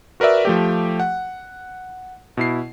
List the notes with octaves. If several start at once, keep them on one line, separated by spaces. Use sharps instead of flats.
F#4 A#4 B4 D5 E5
F3 A3 G4
F#5
B2 E4 C7